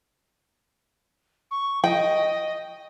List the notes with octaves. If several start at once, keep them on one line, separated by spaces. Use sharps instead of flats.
C#6
D#5 G5